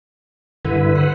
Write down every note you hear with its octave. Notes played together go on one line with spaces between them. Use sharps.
G2 D3 E4 B4
B4 C5 F#5